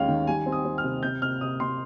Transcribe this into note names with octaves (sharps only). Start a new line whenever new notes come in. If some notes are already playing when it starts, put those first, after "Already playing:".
Already playing: D#2 G#3 C#4 F5 G5
D#3
G3 G#5
C4
D#6
C4
F6
C3
C3 G6
C3 F6
C3 D#6
C3 C6